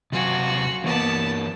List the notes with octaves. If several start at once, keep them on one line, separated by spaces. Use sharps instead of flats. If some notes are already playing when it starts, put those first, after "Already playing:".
C3 F#3 F4 F#4 G#5
E3 A#3 B3 A#4 A5